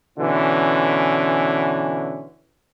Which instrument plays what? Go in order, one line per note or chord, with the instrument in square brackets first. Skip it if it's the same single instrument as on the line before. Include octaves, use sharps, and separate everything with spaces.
[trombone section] B2 D3 E3 C#4